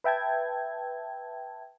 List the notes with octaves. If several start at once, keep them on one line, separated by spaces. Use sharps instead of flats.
B4 E5 G5 A5 G#6